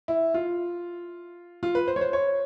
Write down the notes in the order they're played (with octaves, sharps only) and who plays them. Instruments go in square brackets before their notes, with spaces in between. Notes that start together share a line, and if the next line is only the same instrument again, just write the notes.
[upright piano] E4
F4
F4
B4
C5
C#5
C5
C#5